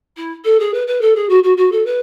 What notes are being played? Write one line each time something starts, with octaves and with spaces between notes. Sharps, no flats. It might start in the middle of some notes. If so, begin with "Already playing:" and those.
E4
A4
G#4
B4
B4
A4
G#4
F#4
F#4
F#4
A4
B4